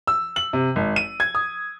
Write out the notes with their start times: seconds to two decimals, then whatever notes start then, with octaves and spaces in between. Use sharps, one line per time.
0.07 E6
0.36 F#7
0.53 C3
0.76 G#1
0.96 D#7
1.20 G#6
1.35 D#6